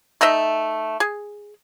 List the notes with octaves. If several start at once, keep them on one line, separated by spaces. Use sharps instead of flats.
A3 D#4 D#5 E5
G#4